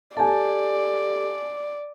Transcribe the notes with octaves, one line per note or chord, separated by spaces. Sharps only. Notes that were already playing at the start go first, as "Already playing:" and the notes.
G4 A4 D5 G#5 A5